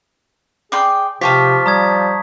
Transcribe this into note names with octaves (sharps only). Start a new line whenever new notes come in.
G#4 D5 G5 C6
C3 F3 G4 C5 F5 A5 C#6 B6
G3 A#5 D#6 G#6